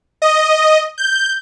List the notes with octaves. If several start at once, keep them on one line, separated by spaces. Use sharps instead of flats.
D#5
G6